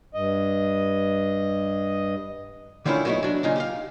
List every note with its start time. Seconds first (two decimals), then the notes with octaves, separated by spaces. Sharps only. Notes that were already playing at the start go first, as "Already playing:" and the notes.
0.14 G2 D#5
2.85 D3 D#3 A3 C#4 E4 F4
3.05 F#3 A3 B3 C#4 D#4 E4
3.23 F#3 D4
3.43 A#2 C#3 D#4 F4
3.56 G4 D#5 F5